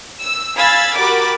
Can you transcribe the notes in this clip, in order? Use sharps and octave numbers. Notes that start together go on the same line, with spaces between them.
E6
F5 G#5 B5 E6 G#6 A6
F#4 G4 A#4 B5 D6 A6